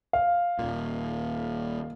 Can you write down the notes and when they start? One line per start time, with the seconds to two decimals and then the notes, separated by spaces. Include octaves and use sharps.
0.13 F5
0.59 D#1 A#2